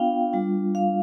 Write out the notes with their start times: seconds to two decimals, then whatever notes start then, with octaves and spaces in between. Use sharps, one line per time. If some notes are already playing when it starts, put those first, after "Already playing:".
Already playing: B3 D4 F4 F5 G5
0.33 G3 D4 F4
0.75 F5